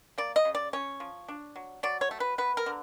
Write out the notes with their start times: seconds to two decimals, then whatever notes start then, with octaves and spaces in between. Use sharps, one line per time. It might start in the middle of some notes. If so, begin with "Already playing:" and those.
0.18 A#3 D5
0.36 D#5
0.45 C#3
0.55 D5
0.73 C#4 C#5
1.00 F3
1.28 D4
1.56 F#3
1.83 F#3 D5
2.01 C#5
2.11 A3
2.20 B4
2.38 B3 B4
2.57 A#4
2.66 D3